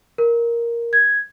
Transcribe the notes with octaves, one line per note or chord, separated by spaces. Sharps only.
A#4
G#6